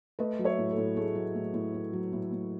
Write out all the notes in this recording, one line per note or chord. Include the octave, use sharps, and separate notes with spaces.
A3 B4 D#5
F#3
C#5 E5
A2
A4
A2
A3 G#4
F#3
A2
A2
A3
F#3
A2
A2